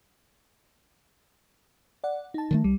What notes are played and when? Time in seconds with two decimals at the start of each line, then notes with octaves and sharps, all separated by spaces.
2.04 D5 F#5
2.34 D#4 A5
2.51 D#3 F#3 A3
2.64 C2 G3